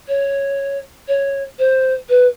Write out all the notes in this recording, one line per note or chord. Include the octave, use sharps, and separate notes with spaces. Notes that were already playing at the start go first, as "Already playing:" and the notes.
C#5
C#5
C5
B4